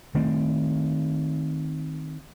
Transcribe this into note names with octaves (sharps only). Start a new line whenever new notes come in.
D#3 A3 C4